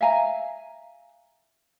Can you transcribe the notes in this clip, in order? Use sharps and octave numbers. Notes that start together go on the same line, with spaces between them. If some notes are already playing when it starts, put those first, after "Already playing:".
E5 F5 G#5 A#5